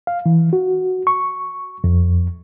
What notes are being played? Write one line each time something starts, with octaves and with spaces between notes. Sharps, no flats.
F5
E3
F#4
C#6
F2